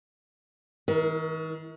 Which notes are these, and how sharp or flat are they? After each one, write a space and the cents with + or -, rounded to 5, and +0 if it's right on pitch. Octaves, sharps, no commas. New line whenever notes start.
D#3 +45 A#4 +5